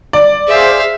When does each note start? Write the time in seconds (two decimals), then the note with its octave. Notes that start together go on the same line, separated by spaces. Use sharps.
0.13 D5
0.48 G#4 C5 E5 F5